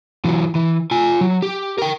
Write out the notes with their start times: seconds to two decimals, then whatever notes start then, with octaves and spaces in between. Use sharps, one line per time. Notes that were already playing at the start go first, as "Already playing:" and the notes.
0.25 E3 F#3
0.55 E3
0.91 F4 G#5
1.21 F#3
1.42 G4
1.78 A#4 G5